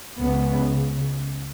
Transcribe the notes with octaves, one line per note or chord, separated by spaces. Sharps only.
C#2 C#3 B3